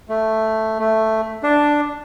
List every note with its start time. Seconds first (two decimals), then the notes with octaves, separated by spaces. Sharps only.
0.09 A3
0.79 A3
1.43 D4